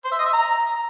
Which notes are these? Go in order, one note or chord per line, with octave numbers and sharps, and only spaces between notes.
C5
E5
D#5
E5
A#5